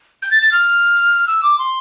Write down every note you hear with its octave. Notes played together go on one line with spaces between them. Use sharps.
G6
A6
A6
F6
E6
D6
C6